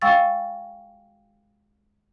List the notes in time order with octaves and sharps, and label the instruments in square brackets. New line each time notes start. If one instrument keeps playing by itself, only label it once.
[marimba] G#3 F5 G5 C#6 E6 A6